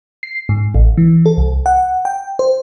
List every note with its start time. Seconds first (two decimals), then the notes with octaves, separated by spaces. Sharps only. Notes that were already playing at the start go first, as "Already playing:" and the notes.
0.23 C7
0.49 G#2
0.75 A1
0.97 E3
1.26 A4
1.37 C2
1.66 F#5
2.05 G5
2.39 C5